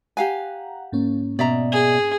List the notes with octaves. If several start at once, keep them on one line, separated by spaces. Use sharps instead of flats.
G4 F5 F#5 G#5 A#5
G#2 A#3 C#4
B2 D5 E5 A#5
G#4